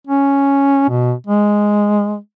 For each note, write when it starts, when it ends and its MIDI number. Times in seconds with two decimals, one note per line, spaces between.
0.07 0.86 61
0.89 1.14 47
1.27 2.17 56